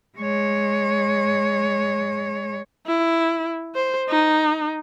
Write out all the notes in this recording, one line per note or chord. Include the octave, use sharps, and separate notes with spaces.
G#3 C#5
E4
C5
D#4